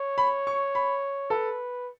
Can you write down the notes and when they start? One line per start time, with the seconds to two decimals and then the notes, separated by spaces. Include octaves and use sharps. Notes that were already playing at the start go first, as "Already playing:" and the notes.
Already playing: C#5
0.18 B5
0.47 C#6
0.75 B5
1.30 A4 B4